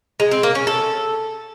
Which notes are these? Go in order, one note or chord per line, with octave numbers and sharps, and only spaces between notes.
G#3
C4
A#3
C#4
A4